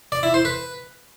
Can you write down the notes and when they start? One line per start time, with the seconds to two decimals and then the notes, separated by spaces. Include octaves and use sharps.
0.12 D5
0.23 E4
0.34 C5
0.45 B4